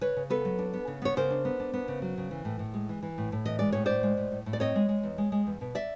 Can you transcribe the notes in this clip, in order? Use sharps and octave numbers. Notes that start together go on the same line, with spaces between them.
C#3 B4 C#5
C#3
B3 A4 B4
F#3
D4
B3
C#3
B3 C#5
C#3 A#4 C5
D4
B3
D4
B3
C#3
F#3
C#3
E3
A2
A2
G#3
E3
E3
A2
A2
E3 D#5
G#3 D5
A2 C#5
A2 C5 D5
G#3
A2
A2
A2
D5
C4 C#5 D#5
G#3
G#3
E2
G#3
G#3
E2
B2
D5 E5